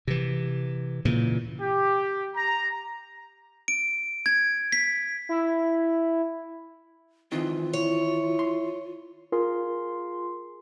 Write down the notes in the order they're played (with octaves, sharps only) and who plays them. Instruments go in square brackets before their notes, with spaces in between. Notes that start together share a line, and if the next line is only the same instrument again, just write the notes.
[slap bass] C3 E3
A#2 C#3 E3
[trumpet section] G4
A#5
[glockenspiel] D7
G#6
B6
[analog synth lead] E4
[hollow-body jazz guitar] D#3 E3 C4 [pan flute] F4
[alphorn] E4 [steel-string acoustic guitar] C#5
[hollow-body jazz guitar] C6
[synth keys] F4 G#4 A#4 C6